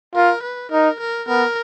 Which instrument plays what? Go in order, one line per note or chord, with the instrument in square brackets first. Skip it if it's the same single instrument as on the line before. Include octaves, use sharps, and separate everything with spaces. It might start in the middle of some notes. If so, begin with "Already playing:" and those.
[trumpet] F4 [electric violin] A#4
[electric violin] B4
[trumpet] D#4 [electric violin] A#4
[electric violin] A#4
[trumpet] B3 [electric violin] A#4